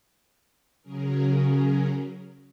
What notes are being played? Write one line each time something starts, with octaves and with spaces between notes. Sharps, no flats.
C#3 F#3 C#4 G#4 A#4